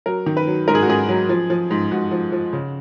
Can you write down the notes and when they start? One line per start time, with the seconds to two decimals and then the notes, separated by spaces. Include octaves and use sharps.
0.06 F#3 A#4
0.26 D#3
0.37 B4
0.47 F#3
0.68 G#2 A#4
0.75 G#4
0.82 F#4
0.88 G#2 G#4
1.09 F#3
1.29 F3
1.50 F3
1.71 G#2
1.91 G#2 F#4
2.11 F3
2.32 F3
2.53 C#3